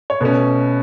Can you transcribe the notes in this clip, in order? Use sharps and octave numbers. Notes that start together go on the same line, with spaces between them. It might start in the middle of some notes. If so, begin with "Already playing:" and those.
C#5
B2 A3 C#4 B4